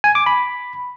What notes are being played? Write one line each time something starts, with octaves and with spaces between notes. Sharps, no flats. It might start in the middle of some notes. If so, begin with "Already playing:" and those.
G#5
D6
B5